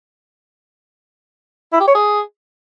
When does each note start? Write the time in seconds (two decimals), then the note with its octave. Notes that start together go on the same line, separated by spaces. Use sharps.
1.73 E4
1.80 G4
1.88 C#5
1.95 G#4